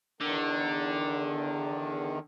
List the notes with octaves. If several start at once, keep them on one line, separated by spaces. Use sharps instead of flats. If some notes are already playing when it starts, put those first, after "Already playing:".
E2 D3 D#3